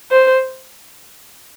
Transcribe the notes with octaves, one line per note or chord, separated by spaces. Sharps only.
C5